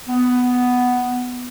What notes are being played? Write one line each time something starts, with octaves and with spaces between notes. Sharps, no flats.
B3